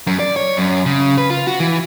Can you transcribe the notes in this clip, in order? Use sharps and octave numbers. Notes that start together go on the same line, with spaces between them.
F#2
D5
C#5
F#2
C#3
B4
F4
F#4
E3